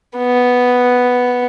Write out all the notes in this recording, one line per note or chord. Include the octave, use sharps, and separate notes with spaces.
B3